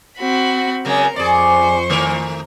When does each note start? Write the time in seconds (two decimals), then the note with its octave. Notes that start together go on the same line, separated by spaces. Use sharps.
0.18 C4 F#4 B5
0.85 C#3 F#3 G#3 A#4
1.16 F2 G#4 C5 D5 C#6
1.90 D#3 A3 A#4